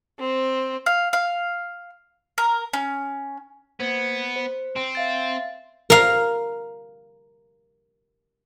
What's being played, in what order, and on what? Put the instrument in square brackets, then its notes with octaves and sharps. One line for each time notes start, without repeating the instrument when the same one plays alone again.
[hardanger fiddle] C4
[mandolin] F5
F5
A#4
C#4
[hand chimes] A#3 C5 G#6 [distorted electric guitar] B3
[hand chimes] C5
[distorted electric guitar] C4
[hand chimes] E5 F5 A6
[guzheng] A#4 F5